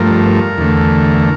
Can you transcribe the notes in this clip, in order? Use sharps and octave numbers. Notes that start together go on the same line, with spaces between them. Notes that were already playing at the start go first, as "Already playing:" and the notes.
Already playing: G2 F3 A3 A#4
E2 D3 A3